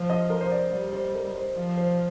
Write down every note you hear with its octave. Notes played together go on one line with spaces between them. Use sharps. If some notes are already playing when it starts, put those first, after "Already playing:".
Already playing: F3 C5
D#5
A#4
C5
D5
G3 D5
C5
A#4
C5
F3
C5